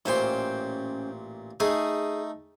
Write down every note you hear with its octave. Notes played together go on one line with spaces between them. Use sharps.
A1 A#2 C#4 C5 G5 C6
A3 D#4 G#4 D#6